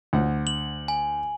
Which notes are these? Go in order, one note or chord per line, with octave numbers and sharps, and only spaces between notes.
D2 F#5
F#7
G#5